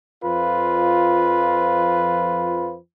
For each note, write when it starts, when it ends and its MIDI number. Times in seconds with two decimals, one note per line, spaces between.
0.24 2.75 41
0.24 2.75 53
0.24 2.75 65
0.24 2.75 71